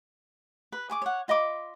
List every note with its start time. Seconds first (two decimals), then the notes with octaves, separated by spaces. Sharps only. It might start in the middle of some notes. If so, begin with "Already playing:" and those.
0.72 B4
0.90 G#4 C#6 D6
1.02 C#5 F#5
1.28 F4 D#5 B5 D6